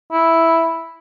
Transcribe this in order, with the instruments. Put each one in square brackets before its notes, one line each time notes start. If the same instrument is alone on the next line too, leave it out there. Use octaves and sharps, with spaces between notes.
[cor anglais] E4